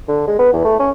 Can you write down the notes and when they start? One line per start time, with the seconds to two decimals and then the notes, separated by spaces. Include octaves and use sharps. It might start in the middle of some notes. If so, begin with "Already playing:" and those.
0.08 D3
0.28 G#3
0.39 B3
0.53 E2
0.65 A3
0.79 C#4